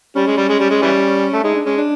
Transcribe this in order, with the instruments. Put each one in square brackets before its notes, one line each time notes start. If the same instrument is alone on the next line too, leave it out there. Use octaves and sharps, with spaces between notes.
[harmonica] G3 [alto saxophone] C#4
[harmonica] G#3
G3
G#3
G3
G#3
E3 G3
A3
[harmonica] G#3 [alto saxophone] D#4
[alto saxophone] D4
[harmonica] G#3 [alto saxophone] C#4
[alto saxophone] D4